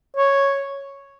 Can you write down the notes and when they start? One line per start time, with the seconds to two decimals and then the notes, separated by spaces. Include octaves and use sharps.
0.16 C#5